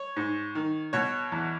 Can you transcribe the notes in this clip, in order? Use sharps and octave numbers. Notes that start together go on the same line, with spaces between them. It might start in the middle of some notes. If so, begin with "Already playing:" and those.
Already playing: C#5
G#2
D#3
B2 C#5
E2